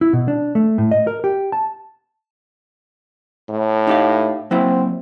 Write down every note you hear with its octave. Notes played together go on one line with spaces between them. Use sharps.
E4
B2
D4
A3
A2
D#5
A#4
G4
A5
A2
D#4 G4 F5
F#3 A#3 C4 E4